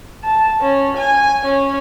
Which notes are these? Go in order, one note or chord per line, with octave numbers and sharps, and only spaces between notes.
A5
C#4
G#5
C#4